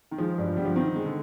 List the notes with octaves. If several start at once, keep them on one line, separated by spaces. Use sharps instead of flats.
D#3
F3 G#3
G2
F3
D3 G3
F3
D#3 C4
G#3
D3